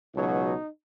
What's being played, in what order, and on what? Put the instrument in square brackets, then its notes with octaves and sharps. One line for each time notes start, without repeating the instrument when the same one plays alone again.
[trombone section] C#2 B2 F#3 D#4